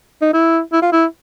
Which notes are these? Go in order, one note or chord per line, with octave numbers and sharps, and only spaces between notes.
D#4
E4
E4
F4
E4